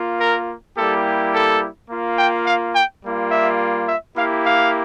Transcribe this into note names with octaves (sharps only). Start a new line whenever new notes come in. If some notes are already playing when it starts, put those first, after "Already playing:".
Already playing: A#3 F4
A#4
G3 A#3 E4 G4 A4
A4
A#3 F4
G5
F5
G5
G3 A#3 F4
E5
E5
A#3 E4 G4 F5
F5